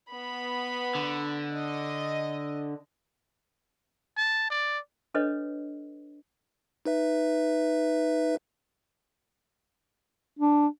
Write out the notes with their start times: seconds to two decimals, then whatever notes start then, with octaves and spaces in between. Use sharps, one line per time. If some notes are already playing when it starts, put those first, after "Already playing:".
0.11 B3 B5
0.95 D3
1.52 D#5
4.17 A5
4.50 D5
5.14 D4 A4 B4 C#5 D#5
6.85 D#4 B4 E5
10.39 D4